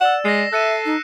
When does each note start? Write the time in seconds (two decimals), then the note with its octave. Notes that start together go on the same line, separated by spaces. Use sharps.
0.01 D5 F#5 E6 E7
0.25 G#3 A#6 C7
0.53 A4 E5 F#6 C#7 D#7
0.85 D#4